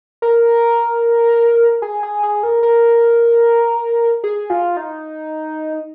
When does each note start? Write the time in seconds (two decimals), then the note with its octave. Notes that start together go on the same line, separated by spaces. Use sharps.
0.22 A#4
1.82 G#4
2.03 G#4
2.23 G#4
2.43 A#4
2.63 A#4
4.24 G#4
4.50 F4
4.77 D#4